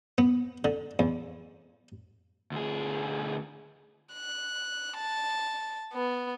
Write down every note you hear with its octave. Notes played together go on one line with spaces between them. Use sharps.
B3
D3
E2
D2 G#4
F#6
A5
B3